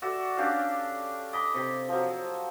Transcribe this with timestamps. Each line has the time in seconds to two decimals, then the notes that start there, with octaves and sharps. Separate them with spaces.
0.02 F#4 A4 D5 E5
0.37 C#4 D4 G4 F5
1.33 D#5 B5 D6
1.54 C3
1.89 F3 F#3